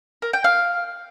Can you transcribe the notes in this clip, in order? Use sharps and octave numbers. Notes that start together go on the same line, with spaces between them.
A#4
G5
F5